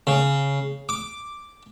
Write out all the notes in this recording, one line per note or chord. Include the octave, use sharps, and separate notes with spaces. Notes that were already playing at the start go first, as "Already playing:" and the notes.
C#3
D6